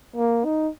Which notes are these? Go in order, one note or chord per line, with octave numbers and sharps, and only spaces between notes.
A#3
D#4